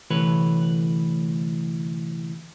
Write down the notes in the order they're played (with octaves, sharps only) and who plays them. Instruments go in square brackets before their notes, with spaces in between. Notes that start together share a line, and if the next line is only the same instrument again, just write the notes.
[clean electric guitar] D2 C3 E3 A3 B4 C#5